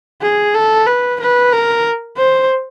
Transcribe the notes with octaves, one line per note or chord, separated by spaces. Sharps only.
G#4
A4
B4
B4
A#4
C5